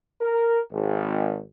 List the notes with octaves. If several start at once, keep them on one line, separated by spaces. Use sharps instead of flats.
A#4
G#1